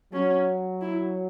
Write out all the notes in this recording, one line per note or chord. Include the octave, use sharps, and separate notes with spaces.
F#3 C#4
E4